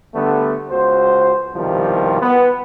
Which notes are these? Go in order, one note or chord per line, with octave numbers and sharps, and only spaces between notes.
D3 G3 A3 B3
C#2 F#4 C5
C2 B2 D#3 F3 G3
B3